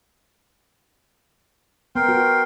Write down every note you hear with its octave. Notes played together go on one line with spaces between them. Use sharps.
B3 A#4 G5 C6
F#4